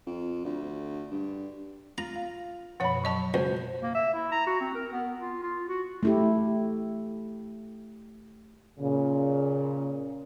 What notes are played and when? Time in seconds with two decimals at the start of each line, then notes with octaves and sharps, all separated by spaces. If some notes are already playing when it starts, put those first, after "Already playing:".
0.06 F2
0.44 D2
1.11 G2
1.98 F4 A#5
2.16 F5
2.80 F#2 B2 F3 C#5 F#5 B5
3.04 F#3 D#5 A5
3.34 C#2 F#4 C5 C#5
3.82 A#3
3.95 E5
4.14 E4
4.32 A#5
4.47 F#4
4.61 C4
4.75 A#4
4.92 B3
5.19 F4
5.43 F4
5.69 F#4
6.03 A3 E4 G4
8.79 A#2 C#3